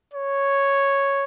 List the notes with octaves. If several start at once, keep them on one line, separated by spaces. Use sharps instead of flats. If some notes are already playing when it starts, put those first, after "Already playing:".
C#5